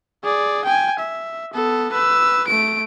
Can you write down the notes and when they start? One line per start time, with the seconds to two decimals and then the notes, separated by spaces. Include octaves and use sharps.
0.23 G#4 D5
0.65 G5 G#5
0.99 E5
1.54 B3 A4
1.92 B4 E6
2.47 A3 D7